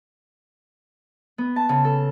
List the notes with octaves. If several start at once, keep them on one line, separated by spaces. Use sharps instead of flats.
B3
A5
C#3
A4